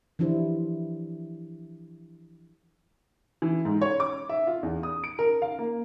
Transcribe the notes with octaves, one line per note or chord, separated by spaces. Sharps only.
E3 F3 D4 E4 G4 C5
E3
G#2
C#5
D6
E5
F4
E2
D#6
D7
A#4
F5
A#3